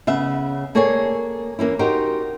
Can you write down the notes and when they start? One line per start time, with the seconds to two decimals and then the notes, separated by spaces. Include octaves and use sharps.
0.07 C#3 B3 E5
0.75 A#3 G#4 A4 C#5 D5 G#5
1.59 E3 A#3 C#4 E4
1.79 D#4 F#4 G4 A#4 C5